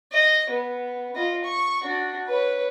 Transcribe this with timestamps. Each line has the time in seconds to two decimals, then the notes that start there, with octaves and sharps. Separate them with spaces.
0.12 D#5
0.50 B3
1.15 F4 D#5
1.44 C#6
1.82 D4 F#4
2.27 B4 C#5